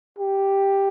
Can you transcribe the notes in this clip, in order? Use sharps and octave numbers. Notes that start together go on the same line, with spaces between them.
G4